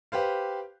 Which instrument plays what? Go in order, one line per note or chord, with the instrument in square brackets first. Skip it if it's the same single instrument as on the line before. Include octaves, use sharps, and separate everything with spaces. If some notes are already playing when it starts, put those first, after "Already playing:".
[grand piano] G4 B4 C5 F5